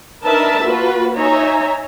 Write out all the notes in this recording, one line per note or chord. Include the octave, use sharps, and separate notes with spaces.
D4 D#4 A#4 B4 E5 A5
A#3 F4 F#4 B4
D#4 C#5 E5 G#5 A#5